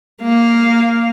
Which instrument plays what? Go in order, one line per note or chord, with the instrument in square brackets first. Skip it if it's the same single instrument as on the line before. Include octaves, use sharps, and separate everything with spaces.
[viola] A#3 F5